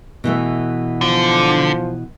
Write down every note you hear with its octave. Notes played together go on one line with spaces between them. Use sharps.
B2 E3 A3
D3 F3